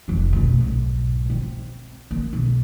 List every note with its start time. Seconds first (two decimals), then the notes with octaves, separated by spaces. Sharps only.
0.08 F1 D#3
0.33 D2 B2
0.60 B1 G#2
1.30 C4
2.11 A#3
2.33 B1 G#3